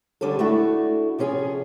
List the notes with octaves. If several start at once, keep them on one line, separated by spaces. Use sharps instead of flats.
D3 G3 C#4 D4 A4
A3 D4 E4 F#4
C3 F3 C#4 G#4